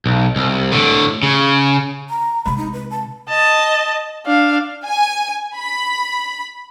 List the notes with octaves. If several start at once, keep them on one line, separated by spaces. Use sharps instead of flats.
B1
C2
A2 D3
C#3
A#5
C3 G#3 B5
D#4
B4
A5
D#5 A5
D4 F5
G#5
B5